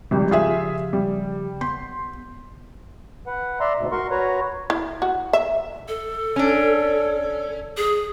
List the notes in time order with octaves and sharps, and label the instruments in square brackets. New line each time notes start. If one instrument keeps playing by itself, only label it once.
[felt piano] G#1 G3 [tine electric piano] C#3 F3 G4
[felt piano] F4 G#4 E5
G3
[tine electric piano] B3 G6 B6 [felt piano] C6
[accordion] B4 F#5
D5 E5 A#5 C6
D2 G#2 B2
F#4 A#4 C6 C#6
F#4 B4 C#5 A#5
[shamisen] E4
F#4
E5
[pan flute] A4
[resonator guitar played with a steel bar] C#4 D4
[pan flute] G#4